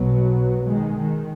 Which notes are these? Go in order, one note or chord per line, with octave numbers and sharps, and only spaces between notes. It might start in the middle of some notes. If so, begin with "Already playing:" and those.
Already playing: B1 B2 F#3 B3
D#3 G#3
D#3